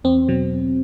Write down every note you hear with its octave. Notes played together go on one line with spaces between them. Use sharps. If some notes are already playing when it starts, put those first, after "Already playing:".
E2 C4
B2 F#3